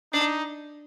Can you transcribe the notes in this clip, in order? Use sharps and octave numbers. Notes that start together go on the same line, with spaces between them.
D4 D#4